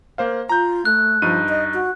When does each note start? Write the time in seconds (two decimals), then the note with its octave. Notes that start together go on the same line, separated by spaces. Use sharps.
0.18 A#3 C5 F5
0.49 F4 A#5 G6
0.85 A3 F#6
1.22 G2 F3 D#4 D#7
1.49 D#5
1.74 F#4